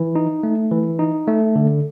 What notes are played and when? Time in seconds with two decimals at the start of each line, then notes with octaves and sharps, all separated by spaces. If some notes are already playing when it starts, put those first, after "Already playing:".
Already playing: E3
0.15 D#4
0.43 A3
0.72 E3
0.99 D#4
1.27 A3
1.56 D3